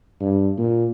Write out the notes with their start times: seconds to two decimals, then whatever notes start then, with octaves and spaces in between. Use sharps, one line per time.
0.21 G2
0.57 A#2